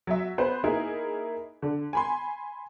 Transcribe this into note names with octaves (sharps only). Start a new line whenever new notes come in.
F#3 E5
B3 B4 C5
A#3 D#4 E4 G#4 A#4
D3
G#5 B5 C6